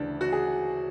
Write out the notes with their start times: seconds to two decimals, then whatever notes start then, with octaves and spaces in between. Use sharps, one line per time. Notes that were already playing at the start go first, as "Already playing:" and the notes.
Already playing: D2 C#3 E3 D4
0.21 F#4
0.32 G#4